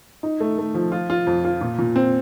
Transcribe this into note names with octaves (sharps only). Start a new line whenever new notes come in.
D#4
A3
A3
F3
F4
F4
F2
F4
A#2
A#2
C4